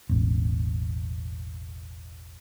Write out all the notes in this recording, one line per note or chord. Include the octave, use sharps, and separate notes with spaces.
E1 A1